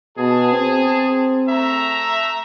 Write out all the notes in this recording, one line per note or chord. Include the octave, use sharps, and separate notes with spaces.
B2 G#4 A5
C4
A3 E5 A#5